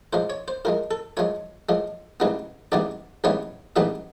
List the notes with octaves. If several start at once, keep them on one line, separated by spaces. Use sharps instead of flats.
A2 F3 G#3 C5
C#5
C5
A2 F3 G#3 A#4
A4
A2 F3 G#3 C#5
A2 F3 G#3
A1 G#2 E3 G3 B3
A1 G#2 E3 G3 B3 D5
A1 G#2 E3 G3 B3 C#5
A1 G#2 E3 G3 B3 E5